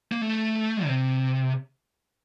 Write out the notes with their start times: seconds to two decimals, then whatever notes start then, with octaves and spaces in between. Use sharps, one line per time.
0.12 A#3
0.21 A3
0.86 C3